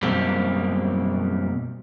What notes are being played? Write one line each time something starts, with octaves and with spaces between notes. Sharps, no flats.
F#2 B2 G3 A#3 C4